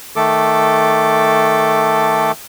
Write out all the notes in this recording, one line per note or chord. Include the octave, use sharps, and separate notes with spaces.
D#3 A3 A4 D6